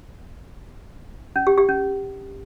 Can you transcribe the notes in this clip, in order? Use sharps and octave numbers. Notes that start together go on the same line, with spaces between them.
C#4
G4
G4
C#4